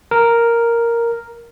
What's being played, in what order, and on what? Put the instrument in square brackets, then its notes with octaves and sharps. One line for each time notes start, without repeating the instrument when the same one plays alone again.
[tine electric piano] A#4